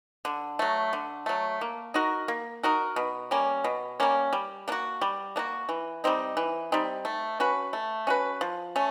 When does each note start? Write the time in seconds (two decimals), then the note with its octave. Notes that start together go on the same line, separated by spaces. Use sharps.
0.25 D3
0.59 F#3 A3
0.93 D3
1.26 F#3 A3
1.61 A#3
1.94 D#4 F#4 A#4
2.28 A#3
2.63 D#4 F#4 A#4
2.96 B2
3.31 G3 A#3 C#4
3.64 B2
4.00 G3 A#3 C#4
4.33 G3
4.68 A#3 D4
4.72 F#4
5.01 G3
5.36 A#3 D4 F#4
5.69 E3
6.04 G3 C4 D#4
6.37 E3
6.72 G3 C4 D#4
7.05 A3
7.40 C#4 F#4 B4
7.73 A3
8.07 C#4 F#4 B4
8.41 F3
8.76 A3 C#4